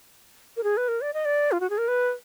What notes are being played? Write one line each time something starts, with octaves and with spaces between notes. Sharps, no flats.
A#4
G#4
B4
A#4
D5
D#5
D5
F4
F#4
G#4
A#4
B4